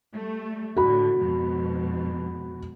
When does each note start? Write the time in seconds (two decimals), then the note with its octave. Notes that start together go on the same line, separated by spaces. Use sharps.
0.13 G3 A3
0.76 A2 D3 F#4 B5
1.18 F2 G#2 B2